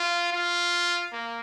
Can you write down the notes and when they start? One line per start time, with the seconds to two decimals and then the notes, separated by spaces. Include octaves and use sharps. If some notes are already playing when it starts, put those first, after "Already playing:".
Already playing: F4
0.32 F4
1.13 A#3